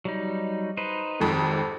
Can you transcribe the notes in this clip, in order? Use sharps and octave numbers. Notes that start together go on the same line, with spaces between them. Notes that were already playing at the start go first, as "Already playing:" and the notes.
F#3 G3 D#4
D#4 B4 C5
G#1 F2 G#2 D#3 G4